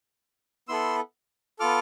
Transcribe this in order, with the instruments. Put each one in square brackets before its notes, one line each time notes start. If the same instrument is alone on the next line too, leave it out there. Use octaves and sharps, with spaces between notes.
[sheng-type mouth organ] B3 E4 A4 C6 E6
B3 F4 A4 D6 F6